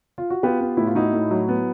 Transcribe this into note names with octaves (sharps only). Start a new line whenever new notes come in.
F4
F#4
B3 F4 G4
B3
A2 E4
F4
D#4 E4 F#4
A2
F#3
B3